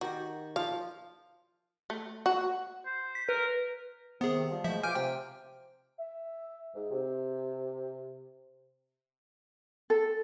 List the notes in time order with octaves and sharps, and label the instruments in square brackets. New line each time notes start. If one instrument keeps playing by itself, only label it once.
[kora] D#3 G4 [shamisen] F#4
[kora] F3 [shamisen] F5
[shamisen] A3
F#4
[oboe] C5
[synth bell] B6
[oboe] A#4 [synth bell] B4
[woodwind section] C3 D#3 [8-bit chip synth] B3 G#4
[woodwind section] F3 G3
[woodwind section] B2 G#3 A3 [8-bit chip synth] F3 E5
[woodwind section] F4 C5 D6 [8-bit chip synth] G#5 F6 G6
[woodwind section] C3 [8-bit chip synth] G5
[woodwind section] E5
G#2
C3
[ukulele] A4